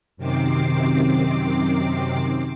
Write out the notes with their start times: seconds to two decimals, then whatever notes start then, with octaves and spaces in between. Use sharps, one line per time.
0.17 F#2 C3 D#3 C4 D6 C7